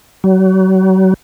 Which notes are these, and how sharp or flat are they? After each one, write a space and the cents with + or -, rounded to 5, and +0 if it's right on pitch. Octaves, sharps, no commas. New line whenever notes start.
F#3 +35